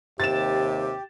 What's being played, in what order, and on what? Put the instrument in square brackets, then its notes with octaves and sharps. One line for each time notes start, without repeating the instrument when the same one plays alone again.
[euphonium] D#2 [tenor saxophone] C3 [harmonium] G4 [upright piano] A6 E7